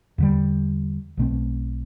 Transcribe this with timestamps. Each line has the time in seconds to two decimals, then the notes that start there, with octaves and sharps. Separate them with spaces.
0.18 E2 D3 G3
1.17 B1 B2 A3 C4